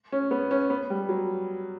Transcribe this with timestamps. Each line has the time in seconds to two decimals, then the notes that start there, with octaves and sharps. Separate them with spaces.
0.12 C#4
0.31 B3
0.51 C#4
0.70 B3
0.90 G3
1.09 F#3